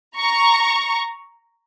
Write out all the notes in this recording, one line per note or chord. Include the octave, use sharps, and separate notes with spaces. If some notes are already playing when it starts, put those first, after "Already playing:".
A#5 C#6